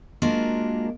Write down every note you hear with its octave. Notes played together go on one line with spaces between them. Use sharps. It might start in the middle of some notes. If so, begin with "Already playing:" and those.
G#3 A#3 D4 F4 F#4 A#4